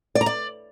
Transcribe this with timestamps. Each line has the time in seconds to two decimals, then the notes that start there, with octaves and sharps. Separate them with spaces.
0.15 D5
0.21 A#5
0.26 D5